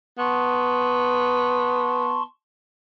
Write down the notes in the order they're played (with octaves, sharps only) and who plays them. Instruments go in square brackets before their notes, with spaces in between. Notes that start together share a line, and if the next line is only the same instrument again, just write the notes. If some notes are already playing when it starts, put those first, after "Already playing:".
[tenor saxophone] B3 [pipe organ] A5 C6 C#6